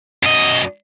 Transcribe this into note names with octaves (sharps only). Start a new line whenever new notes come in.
F#2 D#5